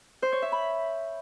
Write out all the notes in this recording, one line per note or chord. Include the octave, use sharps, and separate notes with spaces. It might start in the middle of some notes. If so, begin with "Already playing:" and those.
C5
C#5
E5
B5